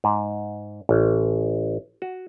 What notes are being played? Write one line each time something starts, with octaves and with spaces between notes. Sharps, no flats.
G#2
A1
F#4